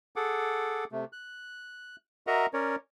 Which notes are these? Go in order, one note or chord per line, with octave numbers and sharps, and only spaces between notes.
G#4 A4 F#5 D6
C3 A3
F#6
F#4 A#4 D#5 E5 F#5 A#5
C#4 A#4 C#5 D5